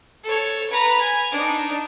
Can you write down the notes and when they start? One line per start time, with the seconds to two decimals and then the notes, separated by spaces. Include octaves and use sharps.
0.24 A4 C#5
0.70 B4 A#5
1.01 G#5
1.32 D4 D#4